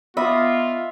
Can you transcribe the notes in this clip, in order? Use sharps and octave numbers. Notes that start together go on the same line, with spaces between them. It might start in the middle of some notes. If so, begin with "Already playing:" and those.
B3 F4 D#5 E5 B5 D6